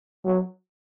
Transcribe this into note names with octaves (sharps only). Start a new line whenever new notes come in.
F#3